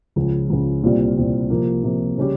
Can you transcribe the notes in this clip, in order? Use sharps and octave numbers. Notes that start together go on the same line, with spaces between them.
C#2 C#3 F3
C#2 C#3 F3
C2 A#2 G3 C4 F4
C2 A#2 G3 C4 F4
C3 F3 A#3
C3 F3 A#3
C#3 G3 C#4 G4